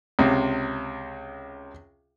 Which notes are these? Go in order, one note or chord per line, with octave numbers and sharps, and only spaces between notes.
C#2 C3